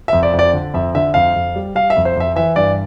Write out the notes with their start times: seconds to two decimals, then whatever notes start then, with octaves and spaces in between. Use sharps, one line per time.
0.08 F2 E5
0.23 D5
0.33 F2
0.39 D5
0.53 D3
0.74 F2 E5
0.95 D3 E5
1.14 F2 F5
1.35 F2
1.56 G3
1.75 G3 F5
1.90 E5
1.96 F2
2.05 C5
2.16 F2 E5
2.36 E3 E5
2.56 G2 D5